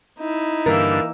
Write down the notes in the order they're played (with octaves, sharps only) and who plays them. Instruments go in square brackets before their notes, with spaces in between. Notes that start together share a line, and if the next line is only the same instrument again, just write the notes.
[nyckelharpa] D#4 E4
[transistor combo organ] G2 D3 [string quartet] E3 A#3 E6 [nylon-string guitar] A#4